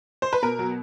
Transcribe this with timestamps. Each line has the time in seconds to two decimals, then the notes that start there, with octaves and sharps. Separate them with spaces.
0.22 C5
0.33 B4
0.42 B2 A#4
0.59 F#3